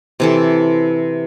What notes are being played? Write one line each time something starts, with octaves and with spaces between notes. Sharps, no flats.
C3 E3 A4